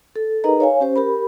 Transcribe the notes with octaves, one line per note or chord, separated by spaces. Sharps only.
A4
D#4 G#4 A#4 B4 D#5 A#5
C#5 F5 G#5
C#4 G4 C5
G4 A#4 B5